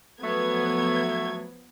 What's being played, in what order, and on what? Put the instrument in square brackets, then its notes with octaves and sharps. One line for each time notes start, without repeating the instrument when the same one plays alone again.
[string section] F3 B3 G#6 [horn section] F#3 A3